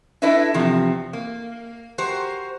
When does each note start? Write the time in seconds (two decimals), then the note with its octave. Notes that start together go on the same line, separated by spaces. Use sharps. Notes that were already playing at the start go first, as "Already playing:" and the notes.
0.22 D4 E4 A4 B4 D#5 E5
0.54 E2 C3 F3
1.13 A#3
1.98 F#4 G4 A#4 C5